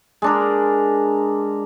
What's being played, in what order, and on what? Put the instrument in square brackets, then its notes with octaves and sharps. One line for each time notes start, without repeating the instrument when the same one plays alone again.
[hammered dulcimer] G#3 D4 A#4